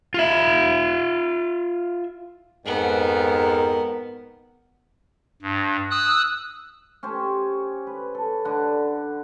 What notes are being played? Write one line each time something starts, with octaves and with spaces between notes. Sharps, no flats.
F4 E5
F2 G#2 B3 A#4
G2
D#6 E6 F#6
C#4 G4 C5 C#5
B4
A4
D3 F#5